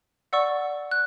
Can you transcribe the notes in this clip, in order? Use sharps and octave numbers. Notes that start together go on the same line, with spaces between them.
D5 F#5 C#6 E6
F#6